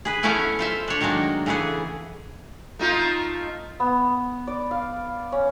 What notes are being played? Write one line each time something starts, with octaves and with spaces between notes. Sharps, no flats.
G#4 B4
A3 B3 C#4 E4 F5 G#5
F4 C5 E5
D4 C#5
D#3 F#3 G#3 A#3 D4
C#3 E3 A3 B3 G#4
A3 D#4 F4
B3
D5
F5
C#4